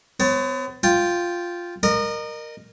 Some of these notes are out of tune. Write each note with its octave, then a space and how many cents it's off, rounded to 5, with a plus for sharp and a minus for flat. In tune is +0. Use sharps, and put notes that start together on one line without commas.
B3 +40 C#5 -30
F4 +0 G5 +0
A#4 +0 D#5 -35